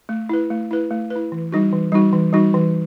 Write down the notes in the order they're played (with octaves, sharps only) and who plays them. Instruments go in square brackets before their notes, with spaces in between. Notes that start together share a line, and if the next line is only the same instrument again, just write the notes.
[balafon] A3
E4 B4
A3
E4 B4
A3
B4
E4
E3
G3 D#4 F#4
E3
G3 D#4 F#4
E3
G3 D#4 F#4
E3